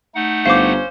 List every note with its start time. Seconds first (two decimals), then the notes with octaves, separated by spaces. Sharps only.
0.15 A3 D#4 F#5
0.46 G1 C#4 C5 F5 D6